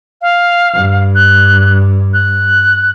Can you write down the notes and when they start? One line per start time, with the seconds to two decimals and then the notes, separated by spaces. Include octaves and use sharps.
0.22 F5
0.74 G2
1.15 F#6
2.14 F#6